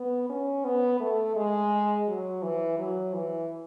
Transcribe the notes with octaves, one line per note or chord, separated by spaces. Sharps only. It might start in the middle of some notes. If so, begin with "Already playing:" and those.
Already playing: B3
C#4
B3
A3
G#3
F#3
E3
F#3
E3